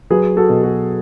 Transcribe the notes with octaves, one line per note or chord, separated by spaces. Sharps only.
F#3 G#4 B4
F#4 A4
B2
F#4 A4